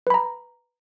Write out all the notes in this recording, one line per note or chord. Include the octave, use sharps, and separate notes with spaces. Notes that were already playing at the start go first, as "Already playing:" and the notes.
B4 A#5 B5